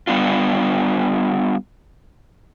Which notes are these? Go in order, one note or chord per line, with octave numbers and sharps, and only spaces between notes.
G3 B3 D4 F4